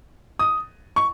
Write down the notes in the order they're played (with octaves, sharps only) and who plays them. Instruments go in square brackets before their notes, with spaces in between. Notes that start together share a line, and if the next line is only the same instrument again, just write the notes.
[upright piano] D#6
C#6